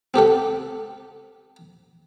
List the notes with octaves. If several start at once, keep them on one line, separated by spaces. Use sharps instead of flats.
C4 G4 A4 F#5